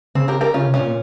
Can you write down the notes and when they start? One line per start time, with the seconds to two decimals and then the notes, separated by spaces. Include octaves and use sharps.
0.15 C#3 C4
0.28 G4 A#4
0.41 G4 A#4
0.54 C#3 C#4 F4
0.67 C3
0.74 C#4 F4
0.80 A#2